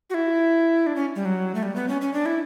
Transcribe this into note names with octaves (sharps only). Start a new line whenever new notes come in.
F#4
E4
D4
C#4
G3
F#3
A3
G3
B3
C#4
C#4
D4
E4